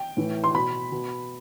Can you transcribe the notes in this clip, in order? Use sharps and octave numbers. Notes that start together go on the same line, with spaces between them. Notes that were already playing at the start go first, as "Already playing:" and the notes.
Already playing: G5
A2 E3
C6
B2 B5
B2